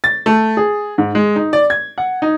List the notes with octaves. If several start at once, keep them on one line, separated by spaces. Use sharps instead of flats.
A6
A3
G#4
G#2
G#3
D#4
D5
G#6
F#5
D#4